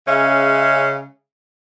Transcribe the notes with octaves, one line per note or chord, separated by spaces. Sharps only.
C#3 G#3 C#4 E5 F5